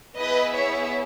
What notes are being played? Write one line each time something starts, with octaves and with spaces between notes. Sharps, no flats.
B3 E4 G#4 B4 D#5
C#5 E5